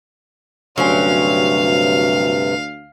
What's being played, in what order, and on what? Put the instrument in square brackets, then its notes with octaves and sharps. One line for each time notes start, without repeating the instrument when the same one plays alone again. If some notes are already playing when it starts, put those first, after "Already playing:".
[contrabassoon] D2 [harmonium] G2 C3 [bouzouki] F#3 C4 C#4 [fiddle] F5